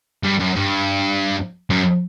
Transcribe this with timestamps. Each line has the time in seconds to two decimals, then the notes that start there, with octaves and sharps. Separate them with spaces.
0.23 G2
0.39 F#2
0.56 G2
1.70 F#2